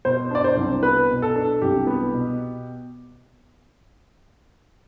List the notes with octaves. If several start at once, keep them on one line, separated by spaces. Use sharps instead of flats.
B2 C5
D4 D5
C5
C2
B3 B4
B2
A4
D4
C2 G4
B3
B2